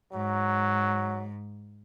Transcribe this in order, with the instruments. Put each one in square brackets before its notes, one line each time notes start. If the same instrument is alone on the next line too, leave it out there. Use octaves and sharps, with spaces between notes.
[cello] G#2 [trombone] F#3